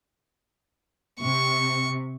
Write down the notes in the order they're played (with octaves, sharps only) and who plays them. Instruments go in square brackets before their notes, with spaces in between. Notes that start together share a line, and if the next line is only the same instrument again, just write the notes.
[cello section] C3 [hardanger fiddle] C#6